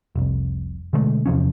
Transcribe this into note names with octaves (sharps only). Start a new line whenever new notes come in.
F1 C2
B2 D3 G#3 A3
E2 C3 F3 C#4